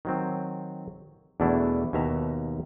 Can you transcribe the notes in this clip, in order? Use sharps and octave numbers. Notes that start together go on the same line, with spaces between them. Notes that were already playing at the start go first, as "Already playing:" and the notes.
D#3 F#3 C4
E2 B2 E3 A3 D4 E4
D#2 B2 E5 A#5